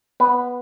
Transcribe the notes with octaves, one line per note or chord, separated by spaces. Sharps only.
B3 B4